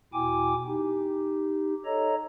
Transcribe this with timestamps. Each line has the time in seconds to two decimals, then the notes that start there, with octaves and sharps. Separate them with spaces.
0.14 E2 B2 E4 G5 G#5 D6
0.67 D#4 G4
1.85 A4 C#5 D#5 A#5